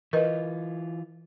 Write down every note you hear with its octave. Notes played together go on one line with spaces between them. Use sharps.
E3 F4 A#4 B4 D#5